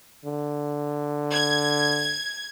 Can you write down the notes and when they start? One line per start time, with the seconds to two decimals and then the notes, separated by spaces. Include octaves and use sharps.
0.25 D3
1.32 G#6